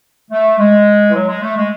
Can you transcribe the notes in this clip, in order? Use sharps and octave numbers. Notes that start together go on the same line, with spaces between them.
A3
G#3
E3
F#3
G#3
A3
G#3